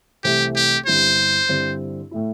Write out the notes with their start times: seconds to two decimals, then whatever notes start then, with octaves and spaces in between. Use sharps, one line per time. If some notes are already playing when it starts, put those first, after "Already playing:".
0.24 C2 C3 E3 A3 C4 G4
0.56 G4
0.86 G1 G2 G3 C4 E4 C5
1.49 G2 D3 C4 E4
2.11 A2 A3 E4